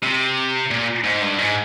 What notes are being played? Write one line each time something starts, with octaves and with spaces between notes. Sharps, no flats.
C3
A#2
G#2
G2
G#2